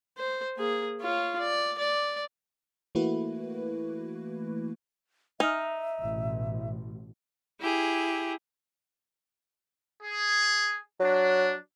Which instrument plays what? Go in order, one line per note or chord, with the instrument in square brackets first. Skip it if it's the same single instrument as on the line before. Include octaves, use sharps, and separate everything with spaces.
[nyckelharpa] C5
A#3 G#4
F4 C#5
D5
D5
[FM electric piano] E3 A3 A#3 E4 F#4 B4
[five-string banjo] D#4 [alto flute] E5 [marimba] G#5 D#6 F6
[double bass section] A1 B2
[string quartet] E4 G4 G#4
[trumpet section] G#4
[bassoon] F#3 [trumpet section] D4